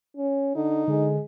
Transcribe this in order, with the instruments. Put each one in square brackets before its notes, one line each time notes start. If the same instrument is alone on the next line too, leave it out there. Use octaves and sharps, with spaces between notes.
[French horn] C#4
[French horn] D3 [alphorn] D#4
[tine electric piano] D3 [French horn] G#3